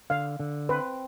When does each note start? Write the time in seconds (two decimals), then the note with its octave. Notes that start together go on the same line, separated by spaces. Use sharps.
0.10 D3 F5
0.40 D3
0.69 C4 B4